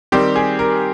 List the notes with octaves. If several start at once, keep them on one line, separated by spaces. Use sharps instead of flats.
D#3 G3 C4 G4
G#4
A#4